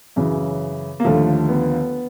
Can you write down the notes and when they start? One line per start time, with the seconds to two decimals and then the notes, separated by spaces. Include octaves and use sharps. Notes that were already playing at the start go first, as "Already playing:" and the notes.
0.16 F#2 C#3 E3
1.00 A#3
1.05 D#2 D3 F3 A3
1.49 B3